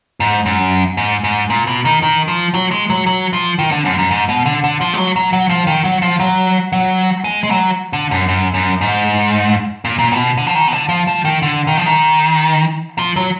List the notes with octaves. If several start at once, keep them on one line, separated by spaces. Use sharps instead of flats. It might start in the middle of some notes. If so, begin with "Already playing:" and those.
G#2
F#2
G#2
G#2
A#2
B2
D#3
D#3
F3
F#3
G#3
F#3
F#3
F3
D#3
D3
F#2
F#2
G#2
B2
D3
D3
F3
G#3
F#3
F#3
F#3
F3
D#3
F#3
F3
F#3
F#3
G#3
G#3
F#3
D3
F#2
F#2
F#2
G#2
A#2
A#2
B2
D3
F3
D#3
B2
D3
F3
F3
D#3
D3
D#3
F3
D#3
F3
F#3